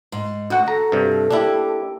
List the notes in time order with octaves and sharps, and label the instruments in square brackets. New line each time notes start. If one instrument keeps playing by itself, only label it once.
[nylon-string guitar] G#2
[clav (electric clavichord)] D2 F#5 [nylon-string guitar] F#4
[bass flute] A4 [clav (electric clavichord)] A#5
[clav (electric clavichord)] G2 C3
[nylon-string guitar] A#3 G4 [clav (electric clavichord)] D4 E4